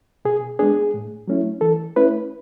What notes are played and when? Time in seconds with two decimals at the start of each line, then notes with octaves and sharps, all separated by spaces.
0.25 B2 G#4
0.59 G#3 B3 D4 G#4
0.94 A2
1.28 F#3 A3 C#4 E4
1.61 E3 A4
1.96 A3 C#4 E4 B4